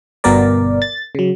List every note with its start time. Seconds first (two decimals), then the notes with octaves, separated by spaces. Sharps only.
0.24 G1 B2 B3 A#4 D5
0.82 A6
1.15 C#3 F#3